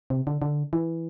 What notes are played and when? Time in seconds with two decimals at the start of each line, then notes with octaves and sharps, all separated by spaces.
0.10 C3
0.27 D3
0.42 D3
0.73 E3